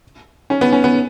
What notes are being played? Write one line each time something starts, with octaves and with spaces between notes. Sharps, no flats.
C#4
B3
C#4
B3